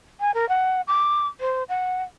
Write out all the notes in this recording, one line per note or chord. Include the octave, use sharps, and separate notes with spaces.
G#5
A#4
F#5
D6
C5
F#5